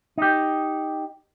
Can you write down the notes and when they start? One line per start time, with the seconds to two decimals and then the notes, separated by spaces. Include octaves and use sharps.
0.18 D#4 G4